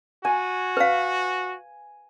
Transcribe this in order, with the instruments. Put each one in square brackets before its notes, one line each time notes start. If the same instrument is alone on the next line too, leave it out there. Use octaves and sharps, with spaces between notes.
[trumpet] F#4 [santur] G#5
[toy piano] B4 F5